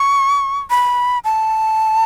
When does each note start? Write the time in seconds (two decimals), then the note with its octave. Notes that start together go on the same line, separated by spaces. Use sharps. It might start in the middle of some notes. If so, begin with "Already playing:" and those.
Already playing: C#6
0.70 B5
1.24 A5